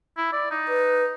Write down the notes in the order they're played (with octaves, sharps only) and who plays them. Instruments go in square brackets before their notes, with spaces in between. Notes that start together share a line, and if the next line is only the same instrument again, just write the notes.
[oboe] E4
D5
D#4
[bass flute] B4